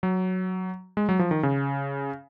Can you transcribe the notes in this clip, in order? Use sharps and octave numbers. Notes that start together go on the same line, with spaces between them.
F#3
G#3
F#3
F3
D#3
C#3